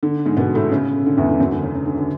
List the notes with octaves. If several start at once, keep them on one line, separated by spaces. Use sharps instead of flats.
D3
G#2 G#3
B2 B3
A2 A3
C#3
D3
E2 E3
D3
F#2 F#3
D3
C#3
C#3
D3
D3